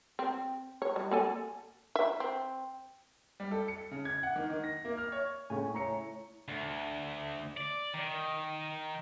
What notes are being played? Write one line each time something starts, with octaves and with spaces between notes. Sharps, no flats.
C4
C#5
G3
A#3 A4 G#5
E5
C4
G3
A4
C#7
C#3
G#6
F#5
D#3
D#3
A#6
A#3
F6
C#5
A2 C#3 C#4 G#5
A3 E4 C#5 A#5 C#7
D2
D5
D#3